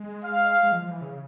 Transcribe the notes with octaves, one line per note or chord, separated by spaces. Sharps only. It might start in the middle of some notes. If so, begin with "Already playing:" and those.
Already playing: G#3
F5
G#3
F3
F3
E3
C#3